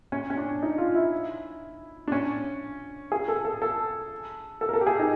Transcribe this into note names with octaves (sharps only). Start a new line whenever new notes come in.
C#4
C#4
D4
D#4
F4
E4
D4
C#4
G#4
A4
A4
A4
A4
A#4
A4
G4
G#4
D#4